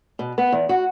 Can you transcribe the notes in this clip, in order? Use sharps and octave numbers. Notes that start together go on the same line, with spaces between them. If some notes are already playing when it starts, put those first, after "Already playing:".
B2
B3
E2
F#4